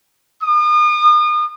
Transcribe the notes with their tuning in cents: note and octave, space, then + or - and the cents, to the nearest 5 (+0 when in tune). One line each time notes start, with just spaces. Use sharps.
D#6 -40